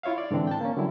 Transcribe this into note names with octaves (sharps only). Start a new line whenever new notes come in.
E4 F4 C#5 E5 F5
D5
G#2 D3 E3 C4 D4
G5 A5
A#3 C#4
D3 F#3 G3 E4